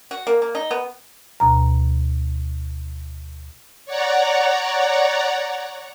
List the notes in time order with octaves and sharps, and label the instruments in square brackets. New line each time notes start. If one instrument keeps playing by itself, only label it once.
[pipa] F#4
A#3
A#3
D#4
B3
[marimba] D2 B2 A#5
[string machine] C#5 D5 F#5 A#5